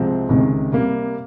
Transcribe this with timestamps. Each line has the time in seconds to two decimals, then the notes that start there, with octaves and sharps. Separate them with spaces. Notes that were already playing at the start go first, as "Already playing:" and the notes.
Already playing: C2 C3 F3 G#3 C4
0.29 C#2 C3 D#3 G#3 C4
0.72 C3 G3 A#3